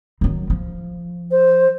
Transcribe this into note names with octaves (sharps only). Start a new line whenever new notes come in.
D#3 F#3
F3
C5